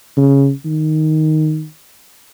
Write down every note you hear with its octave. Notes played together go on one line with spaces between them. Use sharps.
C#3
D#3